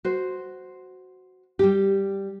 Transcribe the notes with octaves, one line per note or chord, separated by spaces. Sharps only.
F#4 C5
G3 G4